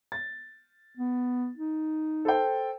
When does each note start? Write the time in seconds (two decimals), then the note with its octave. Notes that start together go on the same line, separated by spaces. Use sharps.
0.12 A6
0.97 B3
1.57 D#4
2.25 A4 C5 G5